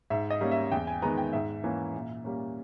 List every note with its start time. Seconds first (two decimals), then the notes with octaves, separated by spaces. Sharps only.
0.10 G#2 E5
0.30 D#5
0.41 G3 A#3 C#4
0.51 E5
0.72 E2 G5
0.87 G#5
1.02 D#3 G#3 B3 A#5
1.18 G5
1.33 G#2 E5
1.64 E3 A#3 C#4
1.94 A#2
2.24 G3 A#3 C#4